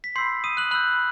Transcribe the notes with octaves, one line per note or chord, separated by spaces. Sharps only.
B6
B5 C6 E6 G6 C7
D#6 D#7
F#6 F#7
B5 E6 F#6 G6 F#7